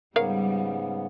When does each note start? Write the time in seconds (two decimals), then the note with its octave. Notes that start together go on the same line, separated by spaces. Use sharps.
0.16 G#2 C#3 G3 B3 A#4 C#5 F5